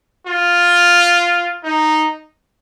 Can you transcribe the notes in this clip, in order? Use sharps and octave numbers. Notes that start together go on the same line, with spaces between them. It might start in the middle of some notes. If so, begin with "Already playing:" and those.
F4
D#4